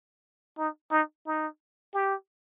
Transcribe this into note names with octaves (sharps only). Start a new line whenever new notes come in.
D#4
D#4
D#4
G4